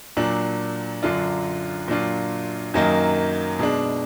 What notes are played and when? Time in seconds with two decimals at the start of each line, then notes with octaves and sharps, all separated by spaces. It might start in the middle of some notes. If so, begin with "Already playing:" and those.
0.17 A#2 F#3 D4
1.03 F#2 D3 F#3 D4 F4
1.88 A#2 F#3 D4 F4
2.74 F#2 D#3 F#3 A#3 D#4
3.59 B2 G#3 D4